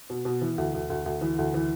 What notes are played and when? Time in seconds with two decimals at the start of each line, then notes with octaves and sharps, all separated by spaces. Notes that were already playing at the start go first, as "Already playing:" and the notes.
0.10 B2
0.25 B2
0.41 E3
0.58 D2
0.74 D2
0.90 D2
1.06 D2
1.21 E3
1.38 D2
1.54 E3